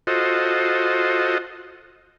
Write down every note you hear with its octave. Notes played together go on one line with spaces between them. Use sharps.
F4 F#4 A4 C5 D#5